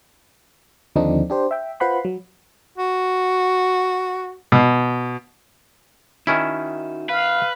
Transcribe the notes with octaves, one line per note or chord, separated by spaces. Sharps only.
D#2 D3 F3 C4 D4 D#4
D4 G4 C5
E5 G5
F4 B4 C5 F#5 B5 C6
F#3
F#4
B2
D#3 C#4 D#4 E4 F#4 E5
B4 F5